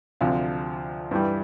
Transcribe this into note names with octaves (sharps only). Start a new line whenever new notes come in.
D2 C3 F3 F5
G2 E3 G3